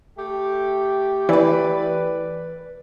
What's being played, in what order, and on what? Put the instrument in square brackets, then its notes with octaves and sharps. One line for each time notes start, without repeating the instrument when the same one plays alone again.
[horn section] A3 G4
[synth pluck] E3 [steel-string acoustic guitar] B4 D5